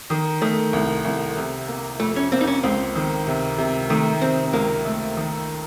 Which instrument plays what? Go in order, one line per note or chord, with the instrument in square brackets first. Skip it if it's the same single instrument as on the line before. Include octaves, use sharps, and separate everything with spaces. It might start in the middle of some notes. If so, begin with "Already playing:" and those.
[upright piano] D#3
[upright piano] D#3 [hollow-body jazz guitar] A3
[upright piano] C2
C2
C3
A#3
[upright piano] F2 [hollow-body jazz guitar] A3
[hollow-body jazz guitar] C#4
[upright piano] A#3 [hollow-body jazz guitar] C4
[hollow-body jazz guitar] D#4
C#4
[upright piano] C#2 [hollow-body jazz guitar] C4
[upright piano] D#3
C3
C3
[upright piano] D#3 [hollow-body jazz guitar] A3
[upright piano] C3 [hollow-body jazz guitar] C4
[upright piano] C#2 [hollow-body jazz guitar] A#3
[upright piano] A3
D#3